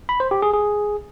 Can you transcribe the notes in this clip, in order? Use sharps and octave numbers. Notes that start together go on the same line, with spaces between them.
B5
C5
G4
G#4
G#4